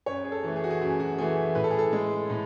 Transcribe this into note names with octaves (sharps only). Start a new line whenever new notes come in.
F#2 C#5
G#4
A4
E3 A3
G#4
F#4
G#4
F#2 F#4
F#4
E3 A3 G#4
A2 B4
A4
G#4
A4
G#3
A2